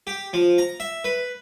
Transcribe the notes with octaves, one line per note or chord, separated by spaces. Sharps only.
G4
F3
A#5
E5
B4